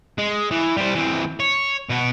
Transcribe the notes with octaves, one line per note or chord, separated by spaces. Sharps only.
G#3
E3
G3 C5
E3 C4
C#5
B2 F#4